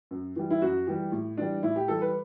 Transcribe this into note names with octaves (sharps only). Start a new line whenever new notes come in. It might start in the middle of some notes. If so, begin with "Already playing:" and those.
F#2
E3 G3
E4
F#2 F#4
E3 G3 G4
A2
E3 G3 D4
A2 E4
G4
E3 G3 A4
B4